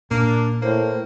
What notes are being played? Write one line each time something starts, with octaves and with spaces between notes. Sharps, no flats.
A#2 A#3 D4
A2 A#3 C5